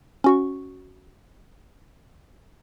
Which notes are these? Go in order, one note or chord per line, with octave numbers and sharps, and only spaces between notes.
C#4 F#4 C#6